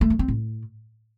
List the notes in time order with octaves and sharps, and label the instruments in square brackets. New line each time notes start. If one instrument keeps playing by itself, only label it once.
[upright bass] A3
F#3
C4
A2